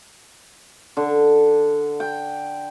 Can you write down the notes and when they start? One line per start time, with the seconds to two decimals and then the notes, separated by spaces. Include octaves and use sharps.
0.97 D3
2.00 G5